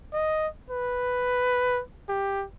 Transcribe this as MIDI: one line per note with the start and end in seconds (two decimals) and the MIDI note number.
0.13 0.48 75
0.70 1.82 71
2.09 2.45 67